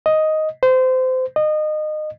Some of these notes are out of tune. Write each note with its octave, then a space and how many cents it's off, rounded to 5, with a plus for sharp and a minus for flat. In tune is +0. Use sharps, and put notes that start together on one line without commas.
D#5 +5
C5 -25
D#5 -25